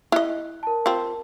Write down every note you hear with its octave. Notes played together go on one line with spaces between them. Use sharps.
E4 D#5 F#6
A#4 A5
C4 F4